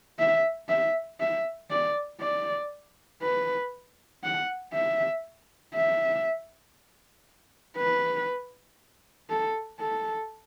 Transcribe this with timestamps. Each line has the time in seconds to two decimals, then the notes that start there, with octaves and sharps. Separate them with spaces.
0.19 E5
0.69 E5
1.20 E5
1.70 D5
2.21 D5
3.22 B4
4.24 F#5
4.74 E5
5.75 E5
7.77 B4
9.30 A4
9.80 A4